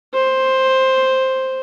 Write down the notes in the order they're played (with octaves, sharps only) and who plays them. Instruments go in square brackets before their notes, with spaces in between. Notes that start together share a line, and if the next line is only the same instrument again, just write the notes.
[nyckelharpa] C5